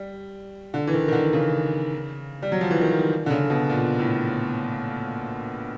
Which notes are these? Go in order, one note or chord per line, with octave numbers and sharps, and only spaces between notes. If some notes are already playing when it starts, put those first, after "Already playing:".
Already playing: G3
D3
E3
D#3
D#3
D3
C#3
G3
F#3
F3
E3
D#3
D3
C#3
B2
A#2
A2